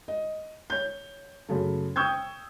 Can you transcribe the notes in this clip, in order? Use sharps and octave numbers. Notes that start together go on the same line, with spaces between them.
D#5
C#5 G6
F#2 C#3 A3
G5 C#6 D#6 E6 G6 G#6